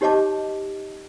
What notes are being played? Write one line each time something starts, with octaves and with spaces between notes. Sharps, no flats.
D#4 G4 C#5 D#5 A5 D6